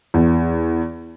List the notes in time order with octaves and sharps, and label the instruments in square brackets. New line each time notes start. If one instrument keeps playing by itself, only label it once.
[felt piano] E2